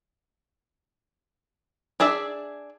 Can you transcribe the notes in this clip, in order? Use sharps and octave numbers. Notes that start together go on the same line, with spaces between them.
D4 G#4 D5 E5